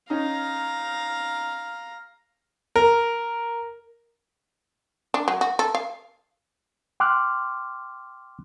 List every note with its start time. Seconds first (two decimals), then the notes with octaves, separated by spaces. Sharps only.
0.10 C#4 D#4 F5 A#5
2.76 A#4
5.14 D4
5.28 F#3
5.41 F#4
5.59 A4
5.75 F5
7.00 G5 C6 D6 F6 F#6